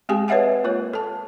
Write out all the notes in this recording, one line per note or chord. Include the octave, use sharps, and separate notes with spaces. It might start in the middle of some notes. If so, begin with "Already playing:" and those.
G#3 C4 G4 G#4 G5 G#5
B4 C#5 D#5 E5 F#5 G#5
A#3 F4 A#4 C#5
A4 A5